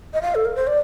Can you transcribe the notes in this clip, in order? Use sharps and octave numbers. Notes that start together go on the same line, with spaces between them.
D#5
F5
A4
A#4
C5
D5